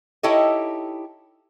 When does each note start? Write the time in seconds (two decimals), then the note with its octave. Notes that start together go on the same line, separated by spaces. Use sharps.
0.23 D#4 E4 G4 A4 C#5 D#5